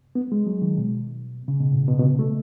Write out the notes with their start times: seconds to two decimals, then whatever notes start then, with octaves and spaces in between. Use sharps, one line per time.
0.15 B3
0.32 G#3
0.47 F#3
0.62 D#3
0.78 B2
1.48 C#3
1.60 B2
1.72 A2
1.88 B2
1.99 B2
2.04 C#3
2.19 A3